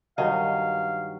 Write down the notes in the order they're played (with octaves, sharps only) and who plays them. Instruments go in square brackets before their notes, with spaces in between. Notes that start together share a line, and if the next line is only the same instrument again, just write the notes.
[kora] G2 D#3 F#3 [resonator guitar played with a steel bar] D#5 [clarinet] F5